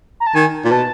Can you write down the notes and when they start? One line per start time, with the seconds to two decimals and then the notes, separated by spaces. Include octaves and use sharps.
0.20 A#5
0.27 A5
0.35 D#3 G#5
0.64 A#2
0.71 B2 A5